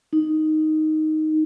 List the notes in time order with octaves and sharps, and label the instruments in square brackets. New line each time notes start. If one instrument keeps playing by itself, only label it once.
[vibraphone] D#4